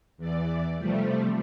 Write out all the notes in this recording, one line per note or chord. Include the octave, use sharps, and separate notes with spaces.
E2 E3 D5
C3 F3 G3 A3